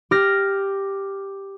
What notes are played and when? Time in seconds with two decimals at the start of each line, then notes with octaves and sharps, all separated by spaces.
0.11 G4 F6 A#6